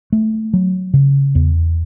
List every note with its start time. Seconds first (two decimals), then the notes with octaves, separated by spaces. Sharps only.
0.13 A3
0.54 F#3
0.94 C#3
1.35 E2